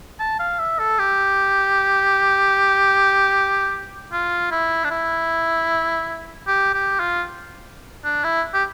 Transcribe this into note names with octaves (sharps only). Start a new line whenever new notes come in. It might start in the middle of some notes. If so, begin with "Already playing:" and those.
A5
F5
E5
A4
G4
F4
E4
D4
E4
G4
G4
F4
D4
E4
G4